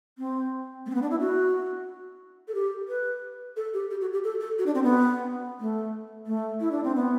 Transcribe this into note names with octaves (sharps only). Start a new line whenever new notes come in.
C4
A3
C4
B3
D4
E4
F#4
A4
G4
B4
A4
G4
G4
F#4
G4
A4
A4
F#4
D4
C4
B3
A3
A3
E4
D4
C4
B3